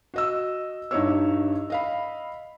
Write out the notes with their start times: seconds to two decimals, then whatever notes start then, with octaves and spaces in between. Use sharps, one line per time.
0.14 F#4 D#5 E6
0.91 G2 D#4 E4 G4 C#5 E6
1.70 D#5 F5 B5